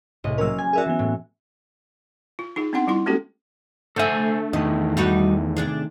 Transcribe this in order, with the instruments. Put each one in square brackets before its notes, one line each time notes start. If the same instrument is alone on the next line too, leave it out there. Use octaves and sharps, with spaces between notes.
[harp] C2 A2 D#5
[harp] F#3 A#3 C#4 [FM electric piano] A#4 E6
[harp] G#5
[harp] F#4 E5 G#5 [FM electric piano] G#4 A#4 D5
[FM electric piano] E3 B3
[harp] A2
[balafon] F4
D#4 F4 G#4
B3 C4 D4 D#4 F#5 C6
G3 E4 F4 C6
G#3 A#3 C#4 F#4 G4 A4
[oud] D3 E5 [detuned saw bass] A3 [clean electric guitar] A4 C5 G#5
[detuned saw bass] E2 [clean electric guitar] D#3 A3 [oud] D#5
[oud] G3 D#4 F#4
C3 D4 G#4